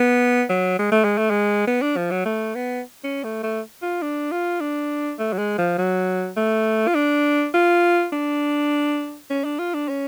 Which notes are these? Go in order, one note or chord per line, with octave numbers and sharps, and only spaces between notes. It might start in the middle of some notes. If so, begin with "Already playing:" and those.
Already playing: B3
F#3
G#3
A3
G#3
A3
G#3
B3
D4
F3
F#3
A3
B3
C#4
A3
A3
F4
D4
F4
D4
A3
F#3
G#3
F3
F#3
A3
F4
D4
F4
D4
C#4
D4
F4
D4
C#4